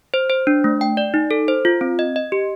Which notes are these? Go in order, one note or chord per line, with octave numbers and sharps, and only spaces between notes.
C5
C5
D4
A3
G5
D5
D#4
A4
C5
F4
C4
D#5
D#5
G4